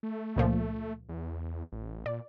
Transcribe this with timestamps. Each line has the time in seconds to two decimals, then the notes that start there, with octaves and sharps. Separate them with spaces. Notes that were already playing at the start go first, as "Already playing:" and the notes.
0.03 A3
0.36 C#2 A#2 F3
1.09 E2
1.72 A1
2.06 A#2 D5